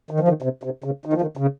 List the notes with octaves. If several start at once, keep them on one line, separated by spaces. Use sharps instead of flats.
D#3
F3
D#3
C3
C3
C#3
D#3
F3
D#3
C#3